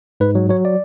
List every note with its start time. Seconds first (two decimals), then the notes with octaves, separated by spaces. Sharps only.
0.20 G#2 B4
0.35 F#3
0.49 F#3 C#5
0.65 D5